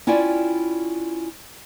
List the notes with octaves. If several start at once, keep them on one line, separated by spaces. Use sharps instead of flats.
C#4 E4 F4 D5 G5 G#5